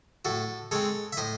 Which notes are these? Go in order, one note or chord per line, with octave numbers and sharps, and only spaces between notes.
A2 F#4 A4
G#3 C4 A4 C#5
E5
A2 C5 D#5